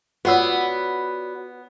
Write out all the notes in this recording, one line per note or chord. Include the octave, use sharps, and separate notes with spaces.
B3 F4 F#4 C#5 D5 F#5 E6